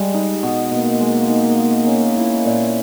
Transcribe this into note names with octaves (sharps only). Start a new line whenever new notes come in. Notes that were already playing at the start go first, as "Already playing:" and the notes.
Already playing: G3 G#3
D#4
B2
B2 A#3
G#3
D#4
G#3
C#4
E4
A#2